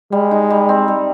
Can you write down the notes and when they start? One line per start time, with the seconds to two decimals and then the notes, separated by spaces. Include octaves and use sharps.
0.12 G3 G#3
0.31 D#4
0.50 G3
0.69 C4
0.88 G3